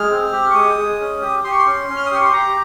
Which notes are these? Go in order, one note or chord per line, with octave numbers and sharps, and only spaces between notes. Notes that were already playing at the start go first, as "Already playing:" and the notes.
Already playing: G#3 F6
C4
G4
C#6
G#3 D#6
G#3
C#4
G4
G4 C6
C#6
C6
C#4
C#4
F6
D#6
G4 C#6
C6
G4 A#5